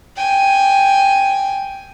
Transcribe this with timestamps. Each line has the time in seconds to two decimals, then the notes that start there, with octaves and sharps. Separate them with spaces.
0.16 G5 G#5